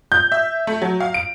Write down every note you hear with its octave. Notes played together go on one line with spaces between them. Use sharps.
G6
E5
A3
F#3
F5
D7